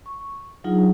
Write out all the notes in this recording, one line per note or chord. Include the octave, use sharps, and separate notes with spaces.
C#6
F#3 D4 D#4 F4 G#4